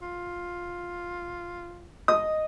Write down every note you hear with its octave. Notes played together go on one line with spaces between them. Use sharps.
F4
D#5 D#6